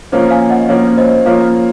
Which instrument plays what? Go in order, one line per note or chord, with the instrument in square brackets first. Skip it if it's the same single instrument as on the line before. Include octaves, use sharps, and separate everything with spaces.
[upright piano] F3 A#3 C#4 [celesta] C5
[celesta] F5 G#5
D#5 F#5
[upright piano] F3 A#3 C#4 [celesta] C#5 F5
[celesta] C#5
C5 D#5
[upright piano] F3 A#3 C#4 F4 [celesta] C#5 F5